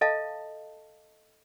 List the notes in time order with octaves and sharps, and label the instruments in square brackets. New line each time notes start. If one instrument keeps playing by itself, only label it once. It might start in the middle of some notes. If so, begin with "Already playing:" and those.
[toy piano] A4 D#5 F5 A5